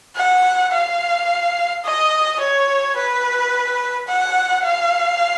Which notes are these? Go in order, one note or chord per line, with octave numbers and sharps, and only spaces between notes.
F#5
F5
D#5
C#5
B4
F#5
F5